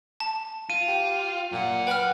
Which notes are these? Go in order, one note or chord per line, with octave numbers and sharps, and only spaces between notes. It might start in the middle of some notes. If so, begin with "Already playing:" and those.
A5
F4 D#7
G4
F#2 A#2 F#5
B4 G5 F6